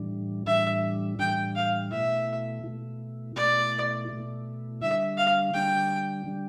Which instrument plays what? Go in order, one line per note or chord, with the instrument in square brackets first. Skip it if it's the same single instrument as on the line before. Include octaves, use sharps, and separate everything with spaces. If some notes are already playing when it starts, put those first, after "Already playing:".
Already playing: [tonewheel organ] A2 E3 G3 D4
[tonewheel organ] A2 E3 G3 D4 [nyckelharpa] E5
[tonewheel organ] A2 E3 G3 D4 [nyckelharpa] G5
[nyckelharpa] F5
[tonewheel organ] B2 A3 E4 [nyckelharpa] E5
[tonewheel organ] B2 A3 E4
[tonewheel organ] B2 A3 E4 [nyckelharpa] D5
[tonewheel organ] B2 A3 E4
[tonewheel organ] D3 G3 D4 [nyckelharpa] E5
[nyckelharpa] F5
[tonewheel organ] D3 G3 D4 [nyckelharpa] G5
[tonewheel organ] D3 G3 D4